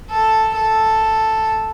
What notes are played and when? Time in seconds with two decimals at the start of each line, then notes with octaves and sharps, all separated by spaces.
0.10 A4
0.55 A4